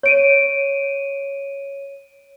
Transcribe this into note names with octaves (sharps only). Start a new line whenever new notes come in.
C#5 D7 D#7